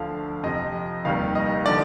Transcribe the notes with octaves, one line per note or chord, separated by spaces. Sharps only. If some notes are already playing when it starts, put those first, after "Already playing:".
Already playing: D2 D3 F3 F5
F2 C3 F3 D#5
F1 D#2 D#3 G3 F5
D#5
D3 F3 D5